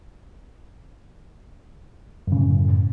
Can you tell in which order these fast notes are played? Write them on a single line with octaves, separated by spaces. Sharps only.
F#2 C#3 A2